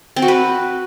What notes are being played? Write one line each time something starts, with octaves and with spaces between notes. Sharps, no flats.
C4
F#4
B4